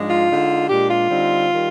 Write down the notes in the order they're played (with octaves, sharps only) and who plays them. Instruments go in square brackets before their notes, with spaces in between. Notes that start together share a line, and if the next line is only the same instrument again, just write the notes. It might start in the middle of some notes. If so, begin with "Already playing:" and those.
Already playing: [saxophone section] G#2 F3 G#3 D4
F4
D3 G#3 D#4
A#2 G#3 D4 F4 G4
F4
D3 G3 C4 D#4
D#3 G3